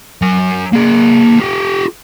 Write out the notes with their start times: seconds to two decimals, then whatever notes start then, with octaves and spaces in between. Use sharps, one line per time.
0.22 F#3 G#5
0.73 A#3 G#4
1.40 F4 G4